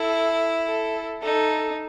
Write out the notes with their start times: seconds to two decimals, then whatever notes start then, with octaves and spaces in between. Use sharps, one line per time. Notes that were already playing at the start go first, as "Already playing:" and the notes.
Already playing: E4 A4
0.68 A4
1.23 D#4 A4